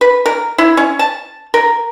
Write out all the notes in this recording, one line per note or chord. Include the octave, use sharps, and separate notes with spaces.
B4
A#4
E4
C#4
A5
A#4